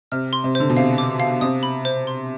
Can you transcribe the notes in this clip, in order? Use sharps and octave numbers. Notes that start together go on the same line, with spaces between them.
C3 F6
C6
C3
D3 C5
B2
C3 F5
D6
F5
C3 D#6
B5
C5
C6